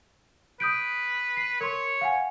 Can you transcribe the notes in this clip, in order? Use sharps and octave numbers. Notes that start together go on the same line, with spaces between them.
B4 D#6 G6 D7
C7
A#4 C#5 C6
F5 F#5 G#5